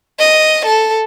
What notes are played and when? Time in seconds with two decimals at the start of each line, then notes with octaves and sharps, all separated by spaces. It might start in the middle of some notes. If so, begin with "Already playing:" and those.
0.20 D#5
0.66 A4